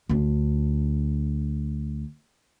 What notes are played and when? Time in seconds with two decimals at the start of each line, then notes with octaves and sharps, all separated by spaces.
0.09 D2 D4